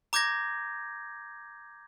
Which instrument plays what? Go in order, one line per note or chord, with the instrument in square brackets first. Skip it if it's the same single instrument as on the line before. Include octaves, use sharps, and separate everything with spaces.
[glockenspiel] A#5 D6 G6 G#6 A#6